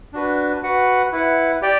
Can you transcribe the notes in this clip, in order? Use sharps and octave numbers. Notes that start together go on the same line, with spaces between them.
D4 F#4 B4
F#4 B4 F#5
E4 B4 F#5
G4 D5 G5